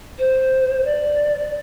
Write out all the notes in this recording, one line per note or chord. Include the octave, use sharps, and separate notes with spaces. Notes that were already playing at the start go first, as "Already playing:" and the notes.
C5
D5